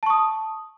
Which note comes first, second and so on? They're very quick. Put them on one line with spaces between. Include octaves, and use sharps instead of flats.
A5 C#6 D#6